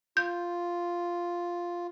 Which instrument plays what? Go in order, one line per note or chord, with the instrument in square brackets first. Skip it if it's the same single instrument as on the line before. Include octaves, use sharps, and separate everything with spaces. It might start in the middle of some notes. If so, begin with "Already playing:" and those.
[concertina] F4 [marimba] G6